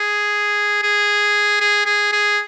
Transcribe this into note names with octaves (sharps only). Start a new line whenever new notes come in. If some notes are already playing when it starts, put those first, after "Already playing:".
Already playing: G#4
G#4
G#4
G#4
G#4